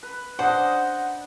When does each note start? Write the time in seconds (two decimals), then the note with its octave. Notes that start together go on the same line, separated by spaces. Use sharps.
0.03 B4
0.39 D4 C5 D#5 F#5